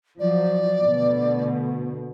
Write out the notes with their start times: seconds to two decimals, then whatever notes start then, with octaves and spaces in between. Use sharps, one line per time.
0.19 F3 F#3 D5
0.82 D2 B2